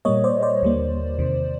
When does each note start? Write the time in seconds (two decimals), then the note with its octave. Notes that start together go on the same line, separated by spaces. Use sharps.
0.05 A#2 G3 A#3 C#5 D#5
0.24 C5 D5
0.43 C5 D5
0.62 D#2 D3 G3 A#3
1.19 E2 C3 D#3